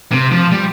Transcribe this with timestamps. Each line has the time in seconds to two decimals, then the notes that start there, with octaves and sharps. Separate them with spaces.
0.12 C3
0.32 F3
0.52 G3